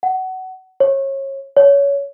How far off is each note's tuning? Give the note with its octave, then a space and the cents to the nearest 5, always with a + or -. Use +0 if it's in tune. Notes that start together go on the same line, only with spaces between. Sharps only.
F#5 +20
C#5 -30
C#5 +20